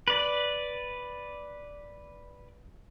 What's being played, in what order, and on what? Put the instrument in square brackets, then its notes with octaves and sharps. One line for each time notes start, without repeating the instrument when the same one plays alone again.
[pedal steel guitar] B4 D5